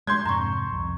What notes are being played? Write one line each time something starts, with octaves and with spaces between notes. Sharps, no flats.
G#3 D4 C6 G6 G#6
F2 G#2 C3 A#5 C#6
C2 F2